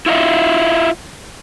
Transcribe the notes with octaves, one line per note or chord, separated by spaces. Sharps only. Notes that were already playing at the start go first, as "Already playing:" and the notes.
E4 F4 D#5 E5